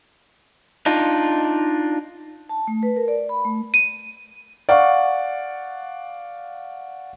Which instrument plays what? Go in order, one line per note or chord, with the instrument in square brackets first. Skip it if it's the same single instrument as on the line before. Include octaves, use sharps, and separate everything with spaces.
[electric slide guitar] D4 D#4 F4
[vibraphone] A5
A3
B4
A#4
D5
B5
A3
[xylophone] D#7
[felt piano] D5 F5 F#5 C#6